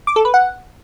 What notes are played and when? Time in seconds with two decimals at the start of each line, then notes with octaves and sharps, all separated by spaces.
0.07 D6
0.16 A4
0.25 B4
0.34 F#5